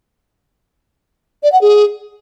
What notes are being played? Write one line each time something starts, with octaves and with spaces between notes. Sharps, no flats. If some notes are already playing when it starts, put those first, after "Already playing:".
D5
F#5
G#4